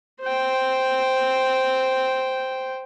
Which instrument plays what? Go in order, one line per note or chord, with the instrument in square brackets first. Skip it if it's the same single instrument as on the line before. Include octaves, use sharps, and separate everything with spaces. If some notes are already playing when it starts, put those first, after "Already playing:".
[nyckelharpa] C5 G5